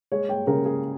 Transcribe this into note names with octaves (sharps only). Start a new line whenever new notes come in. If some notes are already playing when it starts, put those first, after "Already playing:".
G#3 C#5
G5
C#3 A#4
G#4